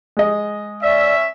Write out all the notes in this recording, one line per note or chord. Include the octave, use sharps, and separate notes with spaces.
G#3 D#5
C#4 D5 E5